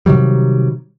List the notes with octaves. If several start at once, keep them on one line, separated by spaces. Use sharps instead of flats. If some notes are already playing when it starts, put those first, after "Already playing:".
C3 D#3 F#3 G3